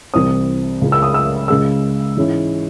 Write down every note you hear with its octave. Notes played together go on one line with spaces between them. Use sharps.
C2 C3 E3 C4 D#6
C#2 C#3 G#3
E6
D#6
E6
C#2 C#3 G#3 E6
G#2 E3 G#3 C#4 E4